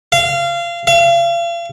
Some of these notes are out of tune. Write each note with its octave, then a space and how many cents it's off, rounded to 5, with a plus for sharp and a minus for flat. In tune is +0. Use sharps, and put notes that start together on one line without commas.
F5 -25
F5 -40